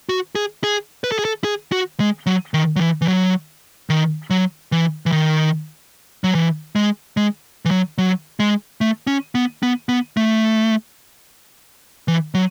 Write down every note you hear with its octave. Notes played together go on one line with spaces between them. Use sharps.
F#4
G#4
G#4
B4
A4
G#4
A4
G#4
F#4
G#3
F#3
D#3
F#3
E3
E3
F#3
D#3
F#3
E3
E3
D#3
F#3
E3
G#3
G#3
E3
F#3
F#3
G#3
A3
C#4
B3
B3
B3
A3
E3
F#3